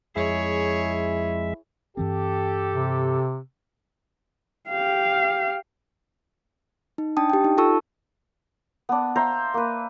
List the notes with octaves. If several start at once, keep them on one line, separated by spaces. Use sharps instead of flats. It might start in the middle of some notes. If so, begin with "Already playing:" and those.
F2 G#3 E4 G#4 C#5 E5
G2 E3 C4 G4 A4
C3
G4 F5
D#4
D4 G5 A5 D#6
G4 G5
D#4
F4 A4 A5 C#6 E6
B3 D4
C5 E5 F5 A#5
A#3 B4